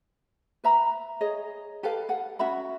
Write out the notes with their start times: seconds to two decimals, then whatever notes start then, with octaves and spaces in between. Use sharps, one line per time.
0.64 B4 E5 A#5 B5
1.21 G#4 C#5 D#5
1.83 G4 A4 B4 F5
2.09 A4 F#5
2.39 C#4 F#4 E5 B5